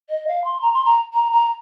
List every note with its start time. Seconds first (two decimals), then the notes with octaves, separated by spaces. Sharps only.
0.09 D#5
0.27 F5
0.44 C6
0.62 A#5
0.74 C6
0.85 A#5
1.14 A#5
1.32 A#5